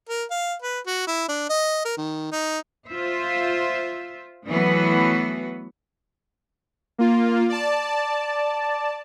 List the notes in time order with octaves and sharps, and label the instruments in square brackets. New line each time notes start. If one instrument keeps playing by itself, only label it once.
[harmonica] A#4
F5
B4
F#4
E4
D4
D#5
A#4
D#3
D#4
[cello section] F4 C5 E5
E3 F#3 A3 B3 F#4 B4
[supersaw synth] A#3 F4
D5 A5